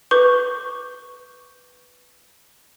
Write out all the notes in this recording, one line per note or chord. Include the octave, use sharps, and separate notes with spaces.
B4 C#6 D6 G6 G7